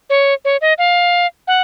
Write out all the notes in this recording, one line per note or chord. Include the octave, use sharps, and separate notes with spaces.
C#5
C#5
D#5
F5
F#5